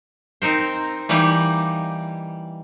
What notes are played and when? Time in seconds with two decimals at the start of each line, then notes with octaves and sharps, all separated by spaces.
0.42 C4 D#4 A#4 C5
1.09 E3 G3 A#3 D#4 G4